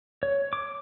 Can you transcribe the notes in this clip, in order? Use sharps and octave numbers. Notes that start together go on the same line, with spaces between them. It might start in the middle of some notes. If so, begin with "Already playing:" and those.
C#5
D6